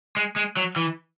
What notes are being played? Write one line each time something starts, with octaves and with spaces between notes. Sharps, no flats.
G#3
G#3
F#3
E3